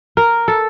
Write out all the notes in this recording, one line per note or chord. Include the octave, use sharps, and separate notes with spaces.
A#4
A4